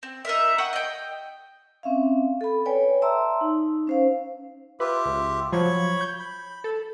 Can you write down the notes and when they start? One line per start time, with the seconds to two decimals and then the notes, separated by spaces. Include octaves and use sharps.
0.03 C4
0.25 D#4 A#4 E5
0.58 F#5 G5 C#6 D#6
0.73 D#5 G5
1.83 C4 C#4 E5 F5
2.41 A4 B5
2.66 B4 C#5 D5 G5 G#5
3.02 D5 E5 A5 A#5 C6 E6
3.41 D#4
3.87 C#4 C5 F5
4.80 F4 G4 B4 E5
5.05 C#2
5.53 F3 F#3 C#5 B5 C#6
6.01 G6
6.19 B5
6.64 A4